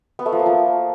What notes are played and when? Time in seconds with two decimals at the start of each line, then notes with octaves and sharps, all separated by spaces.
0.19 B3
0.26 A3
0.32 F3
0.39 A#3
0.46 F3